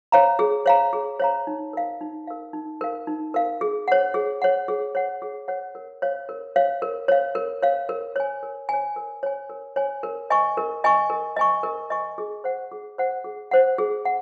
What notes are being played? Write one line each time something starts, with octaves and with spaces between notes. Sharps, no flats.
C#5 F5 A#5
G#4
C#5 F5 A#5
G#4
C#5 F5 A#5
D#4
A#4 F5
D#4
A#4 F5
D#4
A#4 F5
D#4
A#4 F5
G#4
C#5 F#5
G#4
C#5 F#5
G#4
C#5 F#5
G#4
C#5 F#5
A#4
C#5 F5
A#4
C#5 F5
A#4
C#5 F5
A#4
C#5 F5
A#4
C#5 G#5
A#4
C#5 G#5
A#4
C#5 G#5
A#4
C#5 G#5
A#4
D#5 G#5 C#6
A#4
D#5 G#5 C#6
A#4
D#5 G#5 C#6
A#4
D#5 G#5 C#6
G#4
C5 F#5
G#4
C5 F#5
G#4
C5 F#5
G#4
F#5